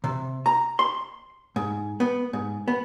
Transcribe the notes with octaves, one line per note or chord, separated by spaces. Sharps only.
C3
A#5
C6
G#2
B3
G#2
B3